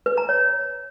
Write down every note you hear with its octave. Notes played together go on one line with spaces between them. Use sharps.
B4
A#5
C#5